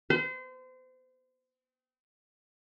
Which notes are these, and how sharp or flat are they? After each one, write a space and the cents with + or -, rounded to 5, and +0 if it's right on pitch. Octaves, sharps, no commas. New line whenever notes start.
C5 -35